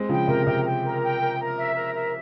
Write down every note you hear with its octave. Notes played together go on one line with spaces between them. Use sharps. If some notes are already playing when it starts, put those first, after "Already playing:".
Already playing: G#3 C4
C#3 F3 G5
C3 A#4
C3 G5
G5
A#4
G5
A#4
A#4
E5
A#4
E5